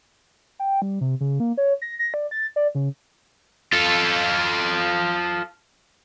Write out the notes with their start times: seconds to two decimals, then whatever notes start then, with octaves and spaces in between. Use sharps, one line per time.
0.59 G5
0.82 G3
1.01 C3
1.20 C#3
1.40 A#3
1.57 C#5
1.82 A#6
1.99 A#6
2.14 D5
2.31 A6
2.56 D5
2.75 C#3
3.73 F4 A4